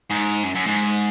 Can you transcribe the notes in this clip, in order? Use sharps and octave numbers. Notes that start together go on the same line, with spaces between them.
G#2
F#2
F#2
G#2